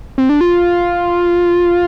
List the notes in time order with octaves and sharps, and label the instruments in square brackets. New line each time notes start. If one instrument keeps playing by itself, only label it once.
[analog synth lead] C4
D4
F4